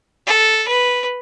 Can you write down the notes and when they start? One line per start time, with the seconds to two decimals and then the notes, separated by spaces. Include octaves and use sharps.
0.26 A4
0.67 B4